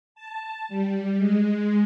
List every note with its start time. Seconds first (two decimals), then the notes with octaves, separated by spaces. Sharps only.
0.15 A5
0.69 G3
1.17 G#3